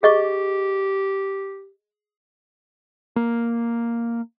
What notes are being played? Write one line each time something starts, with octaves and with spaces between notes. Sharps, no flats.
G4 G#4 D#5 C#6
A#3